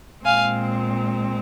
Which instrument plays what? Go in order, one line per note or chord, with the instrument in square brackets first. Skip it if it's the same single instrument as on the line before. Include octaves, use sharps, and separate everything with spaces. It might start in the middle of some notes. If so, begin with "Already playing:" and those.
[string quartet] A#2 G#3 C4 F5 G#5